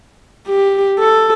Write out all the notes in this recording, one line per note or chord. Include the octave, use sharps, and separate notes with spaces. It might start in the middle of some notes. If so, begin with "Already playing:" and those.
G4
A4